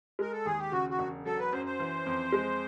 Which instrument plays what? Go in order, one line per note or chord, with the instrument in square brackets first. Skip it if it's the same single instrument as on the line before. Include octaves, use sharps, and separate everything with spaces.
[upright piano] G#3 [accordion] A#4
[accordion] A4
[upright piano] D#2 [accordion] G#4
[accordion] G4
[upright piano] C#3 [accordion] F#4
[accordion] F#4
[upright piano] E1
[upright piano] F#3 [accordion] A4
[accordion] B4
[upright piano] F#2 [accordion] C5
[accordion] C5
[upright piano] E3
F2
G#3